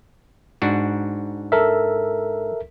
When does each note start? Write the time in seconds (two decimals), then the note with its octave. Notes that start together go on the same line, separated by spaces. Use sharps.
0.62 G#2 D4 F#4
1.52 A4 A#4 E5